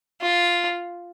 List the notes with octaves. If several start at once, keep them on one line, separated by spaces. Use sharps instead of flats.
F4